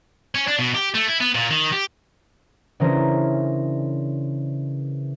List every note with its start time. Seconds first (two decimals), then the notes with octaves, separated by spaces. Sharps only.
0.35 C#4
0.47 D4
0.59 B2
0.75 G4
0.95 A3
1.08 E4
1.21 B3
1.35 A#2
1.51 D#3
1.72 G4
2.80 C#3 E3 C#4 D4 A#4 C5